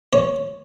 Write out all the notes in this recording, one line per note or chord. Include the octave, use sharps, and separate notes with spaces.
C#5